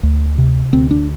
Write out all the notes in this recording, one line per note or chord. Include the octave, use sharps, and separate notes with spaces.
D2
C3
D2 C4
D4